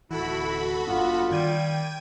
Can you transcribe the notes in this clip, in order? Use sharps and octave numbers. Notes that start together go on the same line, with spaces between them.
D1 G1 E3 E4 F#4 A4 B5
F1 G2 B3 D4 F4
D#3 G3 G5 G#6 D#7